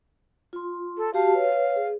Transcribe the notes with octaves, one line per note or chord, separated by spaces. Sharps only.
F4 C6
A4
F#4 G4 F5 A5
B4 C#5
G#4